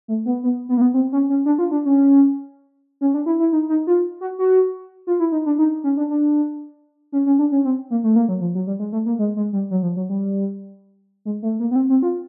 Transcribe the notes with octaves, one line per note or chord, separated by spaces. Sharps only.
A3
B3
B3
B3
A#3
B3
C4
C#4
C#4
D4
F4
D4
C#4
C#4
D4
E4
E4
D#4
D#4
F4
F#4
F#4
F4
E4
D#4
D4
D#4
C#4
D4
D4
C#4
C#4
D4
C#4
C4
A#3
A3
A#3
F#3
F3
F#3
G3
G#3
A3
A#3
G#3
G#3
G3
F#3
F3
F#3
G3
G#3
A3
A#3
B3
C4
C4
F4